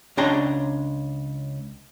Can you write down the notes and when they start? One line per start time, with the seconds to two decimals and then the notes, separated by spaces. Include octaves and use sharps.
0.17 C#2 C#4 D4 G5 A#5 C6